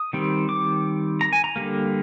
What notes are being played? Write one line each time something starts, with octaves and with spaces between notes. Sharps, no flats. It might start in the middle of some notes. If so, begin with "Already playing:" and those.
Already playing: D#6
D#3 G3 C4
D6
A#5
G#5
A#5
D3 G3 A#3